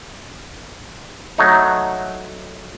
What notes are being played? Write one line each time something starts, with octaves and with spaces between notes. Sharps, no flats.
F#3 A3 D#4